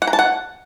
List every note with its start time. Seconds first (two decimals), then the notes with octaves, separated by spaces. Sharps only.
0.02 F#5
0.07 A#5
0.13 A5
0.19 F#5